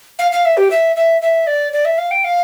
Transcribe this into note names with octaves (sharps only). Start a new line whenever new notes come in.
F5
F5
E5
G4
E5
E5
E5
D5
D5
E5
F5
G5
F5